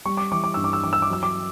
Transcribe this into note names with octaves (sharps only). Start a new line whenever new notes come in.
G3 C#6
D6
E3 D6
D6
G2 E6
D6
E6
E3 D6
E6
D6
F#3 E6
D6